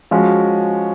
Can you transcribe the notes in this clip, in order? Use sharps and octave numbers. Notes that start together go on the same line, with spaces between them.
F3 G#3 C#4 F#4